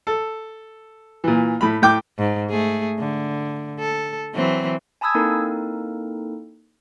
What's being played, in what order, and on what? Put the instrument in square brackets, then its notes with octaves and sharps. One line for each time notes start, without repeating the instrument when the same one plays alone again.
[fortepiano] A4
A#2 E3
A2 B5
A2 G5 D6
[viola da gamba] G#2
A3 G#4
D3
A4
E3 F#3 C4
[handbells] G#5 A5 B5 D#6 E6 G#6
A#3 C4 D#4 E4 A4 A#4